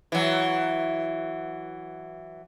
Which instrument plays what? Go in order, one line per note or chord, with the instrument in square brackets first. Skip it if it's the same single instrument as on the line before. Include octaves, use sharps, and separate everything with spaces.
[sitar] E3 F#3